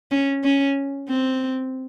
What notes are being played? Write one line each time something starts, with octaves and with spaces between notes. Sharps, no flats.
C#4
C#4
C4